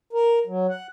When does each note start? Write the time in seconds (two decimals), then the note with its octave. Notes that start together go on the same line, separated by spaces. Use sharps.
0.13 A#4
0.47 F#3
0.69 F#5